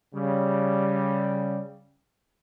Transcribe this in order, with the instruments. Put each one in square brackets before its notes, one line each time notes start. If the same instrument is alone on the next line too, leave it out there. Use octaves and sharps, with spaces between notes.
[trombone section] C#3 G3